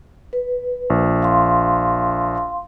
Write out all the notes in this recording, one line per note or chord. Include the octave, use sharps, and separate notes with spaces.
B4
A#1
F5 C6